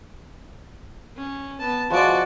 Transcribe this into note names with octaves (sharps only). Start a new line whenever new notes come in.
C#4
B3 A5
F3 G#3 F#4 D5